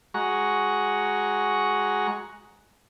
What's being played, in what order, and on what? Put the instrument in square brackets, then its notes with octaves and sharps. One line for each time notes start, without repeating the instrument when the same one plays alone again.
[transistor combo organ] G#3 F#4 A#5 C#6